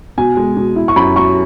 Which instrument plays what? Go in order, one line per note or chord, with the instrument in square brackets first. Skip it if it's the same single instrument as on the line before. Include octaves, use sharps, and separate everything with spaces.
[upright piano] B2 G#5
G#3
B2
E4
C#6
F#2 B5
F#3 C#6